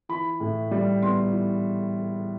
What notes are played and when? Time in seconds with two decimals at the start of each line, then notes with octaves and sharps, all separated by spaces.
0.09 E3 B5
0.40 A2
0.71 G3
1.02 B3 C6
1.33 E3